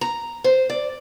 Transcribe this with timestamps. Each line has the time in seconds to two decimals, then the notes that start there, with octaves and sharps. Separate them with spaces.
0.01 A#5
0.44 C5
0.70 D5